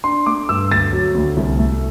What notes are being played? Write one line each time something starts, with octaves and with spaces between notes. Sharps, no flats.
D4 C6
A3 D6
G2 E6
D2 A6
F#3
D2
C2
A3